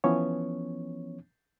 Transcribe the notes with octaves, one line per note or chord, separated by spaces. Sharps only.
E3 F3 B3 C#4 C#5